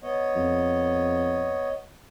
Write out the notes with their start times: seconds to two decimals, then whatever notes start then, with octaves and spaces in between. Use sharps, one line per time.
0.03 B3 C#5 D#5
0.35 F2